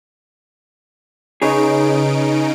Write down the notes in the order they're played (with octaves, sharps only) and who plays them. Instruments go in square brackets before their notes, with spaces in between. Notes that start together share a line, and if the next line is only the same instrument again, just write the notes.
[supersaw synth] C#3 D#4 D7 [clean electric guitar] G#4 B4 C#5